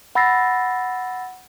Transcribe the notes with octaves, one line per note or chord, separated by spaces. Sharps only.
F#5 B5 E6 A6 A#6 C7